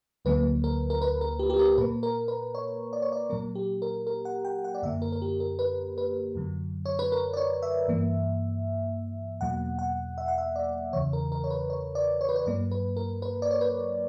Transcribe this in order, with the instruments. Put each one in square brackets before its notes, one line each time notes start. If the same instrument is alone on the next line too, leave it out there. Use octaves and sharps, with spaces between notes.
[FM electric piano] D2 D3 F#3 A#3 B4
A#4
A#4
B4
A#4
G4
G4
A#4
A#2 A#3 B4
A#4
B4
C#5
D5
C#5
D5
A#2 F#3 A#3 A#4
G4
A#4
A#4
F#5
G5
F#5
D5
F#2 D3 A#3 E5
A#4
A#4
G4
A#4
B4
B4
F#2 D3 F#3
C#5
B4
A#4
D5
C#5
E5
G2 E3 A#3
E2 B2 F#3 A#3 F#5
F#5
E5
F#5
E5
D5
E2 C#3 E3 C#5
A#4
A#4
C#5
B4
C#5
D5
C#5
B4
C#5
G2 F#3 A#3 D5
B4
A#4
B4
D5
C#5
B4